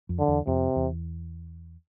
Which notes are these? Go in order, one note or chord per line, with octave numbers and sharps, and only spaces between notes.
F2
D3
E2
F2 C3
E2